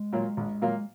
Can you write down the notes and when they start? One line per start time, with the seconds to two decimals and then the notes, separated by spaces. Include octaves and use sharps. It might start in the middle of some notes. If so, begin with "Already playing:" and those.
Already playing: G#3
0.13 A#2 F#3 A#3 F4
0.37 A#1
0.62 A#2 F#3 A#3 F4